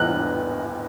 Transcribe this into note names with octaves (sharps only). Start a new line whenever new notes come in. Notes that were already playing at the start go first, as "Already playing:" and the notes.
Already playing: E2 F#6